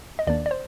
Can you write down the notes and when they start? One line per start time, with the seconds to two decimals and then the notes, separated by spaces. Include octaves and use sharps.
0.19 D#5
0.27 D#2 D#3 A#3 D4 D5
0.46 D5
0.51 C5